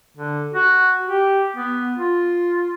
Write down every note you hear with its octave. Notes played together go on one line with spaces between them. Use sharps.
D3
F#4
G4
B3
F4